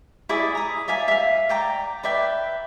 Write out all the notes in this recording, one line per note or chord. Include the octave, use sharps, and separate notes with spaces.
E4 G#4 D5 E5
A#5 D#6
D5 E5 F5 G#5
E5 F5
D5 G5 A#5
B4 D5 E5 G5